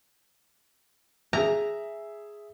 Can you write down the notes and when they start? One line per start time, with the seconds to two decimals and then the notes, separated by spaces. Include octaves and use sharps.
1.33 G#4 E5 A#5